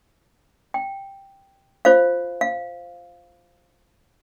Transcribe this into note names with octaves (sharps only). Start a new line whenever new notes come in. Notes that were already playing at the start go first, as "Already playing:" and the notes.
G5
F4 C5 F5
F5